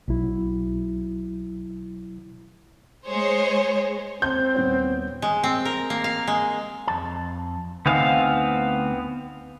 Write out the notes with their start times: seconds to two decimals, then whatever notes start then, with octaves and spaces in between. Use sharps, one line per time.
0.08 B1 B2 F#3 E4
3.06 G#3 G#4 C5 C#5
4.22 C4 C6 G6
4.54 D#1 B3 C#5
5.22 G#3
5.43 C4
5.65 A#4
5.90 A#3
6.04 F5
6.27 G#3
6.88 F2 A5
7.86 D2 B3 C4 D#4 F5 G#5